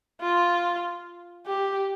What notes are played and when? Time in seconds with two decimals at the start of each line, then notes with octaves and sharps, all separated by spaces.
0.21 F4
1.47 G4